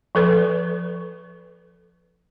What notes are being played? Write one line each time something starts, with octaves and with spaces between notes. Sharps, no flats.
F3 A4 B4